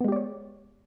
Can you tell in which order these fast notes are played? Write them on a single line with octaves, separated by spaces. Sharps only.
B3 G#3 G4 D5 C#5